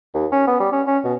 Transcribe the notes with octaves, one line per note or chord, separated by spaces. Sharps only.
D#2
C#4
B3
G3
C#4
C#4
B2